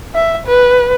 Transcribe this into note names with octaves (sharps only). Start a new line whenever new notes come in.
E5
B4